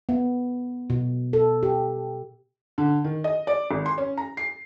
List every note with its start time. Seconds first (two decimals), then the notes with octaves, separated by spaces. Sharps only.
0.09 B3
0.90 B2
1.33 A4
1.63 G4
2.78 D3
3.04 D#3
3.24 D#5
3.47 D5
3.71 G#1
3.86 C6
3.98 C#4
4.18 A#5
4.37 C7